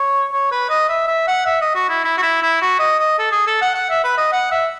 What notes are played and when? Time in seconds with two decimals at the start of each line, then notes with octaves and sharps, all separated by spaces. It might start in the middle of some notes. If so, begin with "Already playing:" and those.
Already playing: C#5
0.32 C#5
0.52 B4
0.70 D#5
0.89 E5
1.08 E5
1.28 F#5
1.46 E5
1.61 D#5
1.75 F#4
1.89 E4
2.04 E4
2.18 F#4
2.22 E4
2.42 E4
2.62 F#4
2.79 D#5
2.99 D#5
3.19 A4
3.32 G#4
3.47 A4
3.62 F#5
3.75 F#5
3.90 E5
4.04 B4
4.18 D#5
4.33 F#5
4.52 E5